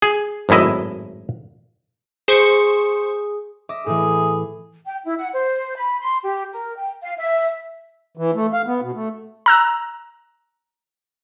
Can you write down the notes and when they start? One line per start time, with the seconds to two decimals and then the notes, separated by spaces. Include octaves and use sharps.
0.02 G#4
0.49 G#1 F#2 A2 E4 D#5
2.28 G#4 C5 C#6
3.69 D#5 E5 D6
3.86 A2 E3 G#4
4.84 G5
5.04 E4
5.16 F#5
5.32 C5
5.75 B5
5.99 C6
6.23 G4
6.51 A#4
6.76 G5
7.01 F5
7.17 E5
8.17 E3
8.35 A3
8.53 F5
8.67 B3
8.82 B2
8.94 A3
9.46 A#5 E6 F#6